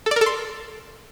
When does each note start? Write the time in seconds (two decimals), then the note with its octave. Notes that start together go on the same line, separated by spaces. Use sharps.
0.06 A4
0.11 D5
0.16 A#4
0.21 A4
0.26 C6